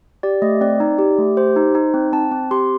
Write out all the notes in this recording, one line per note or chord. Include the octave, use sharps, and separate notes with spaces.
G4 D5
A3 D#5
C4 D5
D#4
G4
A3
G4 C5
D#4
D#4
C4
C4 A5
C4
G4 C6